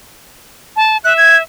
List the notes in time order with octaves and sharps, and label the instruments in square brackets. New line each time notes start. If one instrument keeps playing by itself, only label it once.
[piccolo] A5
[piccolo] E5 [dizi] F#6
[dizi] G#6